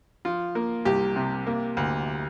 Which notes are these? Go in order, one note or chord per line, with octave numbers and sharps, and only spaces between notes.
F3 F4
A#3
C2 G4
C3
A#3
D2